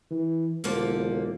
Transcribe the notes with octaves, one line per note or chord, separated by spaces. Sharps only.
E3
E1 D3 F3 A#3